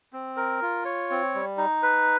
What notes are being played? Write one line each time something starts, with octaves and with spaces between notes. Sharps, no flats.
C4
A#4
F4
C#5
C4
G3
D#4
B4